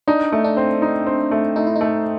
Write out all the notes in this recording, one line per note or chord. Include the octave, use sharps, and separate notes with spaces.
D4 D#4
A3
D4
C4
D#4
C4
A3
A3 D#4
E4
D#4
A3